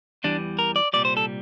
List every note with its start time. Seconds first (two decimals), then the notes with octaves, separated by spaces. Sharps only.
0.24 E2 E3 G3 D4
0.59 A#4
0.76 D5
0.93 C2 A#2 G3 D5
1.05 C5
1.17 A4